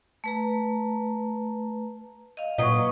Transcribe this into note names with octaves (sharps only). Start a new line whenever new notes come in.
A3 B4 A#5
D#5 F5
A#2 F#3 A#3 B4 D#5